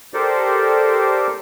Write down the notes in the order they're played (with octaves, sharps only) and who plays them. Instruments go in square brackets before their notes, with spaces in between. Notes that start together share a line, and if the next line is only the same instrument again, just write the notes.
[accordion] G4 A4 A#4 C5 D5